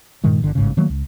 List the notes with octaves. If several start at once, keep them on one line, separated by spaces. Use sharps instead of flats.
G2 A#2 D#3 G#3
G1 D3
A1 G#2 C#3
D#3 F#3 A3 A#3
C#2